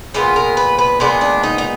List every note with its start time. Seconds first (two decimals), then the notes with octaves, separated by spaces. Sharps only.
0.14 A#2 G#3 B3 F4
0.36 A#4
0.57 B4
0.78 B4
1.00 A#2 G#3 B3 D4
1.21 D4
1.43 D#4
1.58 D#4